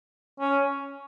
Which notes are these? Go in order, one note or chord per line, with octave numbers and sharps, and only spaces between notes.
C#4